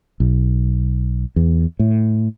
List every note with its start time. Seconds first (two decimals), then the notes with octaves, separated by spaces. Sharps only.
0.20 B1
1.36 E2
1.79 A2